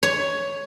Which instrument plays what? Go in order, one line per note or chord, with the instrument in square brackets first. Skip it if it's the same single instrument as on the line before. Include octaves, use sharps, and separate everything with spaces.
[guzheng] C#5